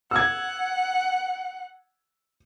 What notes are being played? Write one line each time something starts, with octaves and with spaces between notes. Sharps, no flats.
F#5 E6 G#6